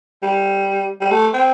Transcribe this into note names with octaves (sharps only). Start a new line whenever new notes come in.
G3
G3
A3
C4